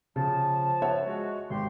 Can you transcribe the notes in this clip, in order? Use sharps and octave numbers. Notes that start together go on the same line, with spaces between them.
C#3 F3 A5
C#5 E5 F#5
G#3 F#4
G#1 G4 C6